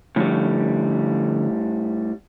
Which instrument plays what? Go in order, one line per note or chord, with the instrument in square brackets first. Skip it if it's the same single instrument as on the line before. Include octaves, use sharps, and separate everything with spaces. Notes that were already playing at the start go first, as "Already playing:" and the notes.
[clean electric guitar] A2 G3 [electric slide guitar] D3 F3 C#4